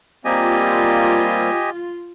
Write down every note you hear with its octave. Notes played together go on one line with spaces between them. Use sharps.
G3 A#3 C4 F4 G4 D#5 G#5